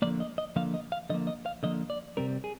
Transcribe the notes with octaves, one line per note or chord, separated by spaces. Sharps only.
D3 F3 A#3 D5
D#5
D#5
D3 F3 A#3 F5
D#5
F5
D3 F3 A#3 D#5
D#5
F5
D3 F3 A#3 D#5
D5
C3 G3 C4 A#4
G#4